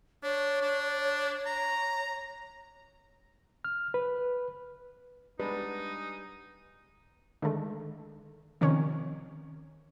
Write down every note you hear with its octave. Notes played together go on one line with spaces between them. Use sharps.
D4 C#5
D4
A#5
F6
B4
G3 G#3 B3 D4 D#4 B4
D3 D#3 G#3 A3
C3 D#3 F3 C#4